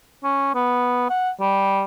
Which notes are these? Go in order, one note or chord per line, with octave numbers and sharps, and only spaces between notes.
C#4
B3
F#5
G3